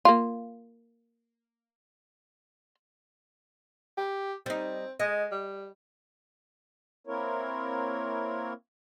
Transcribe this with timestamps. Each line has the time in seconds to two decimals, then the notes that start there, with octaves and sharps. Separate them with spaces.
0.05 A#3 F4
3.97 G4
4.46 G3 C4 D#4
5.00 G#3 D#5
5.31 G3
7.07 A#3 C4 E4 A#4 C#5